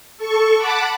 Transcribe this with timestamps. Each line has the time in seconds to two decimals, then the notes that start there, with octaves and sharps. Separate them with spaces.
0.17 A4 C#6
0.56 F#5 A5 B5 D6